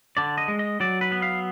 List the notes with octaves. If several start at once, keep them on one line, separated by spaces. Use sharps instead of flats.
D3 D5
D#5
G#3
D#5
F#3 D5
B4
B3
F5